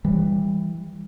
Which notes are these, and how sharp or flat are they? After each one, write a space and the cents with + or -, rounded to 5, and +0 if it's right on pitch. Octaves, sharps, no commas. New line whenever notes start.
E3 +0 G3 +20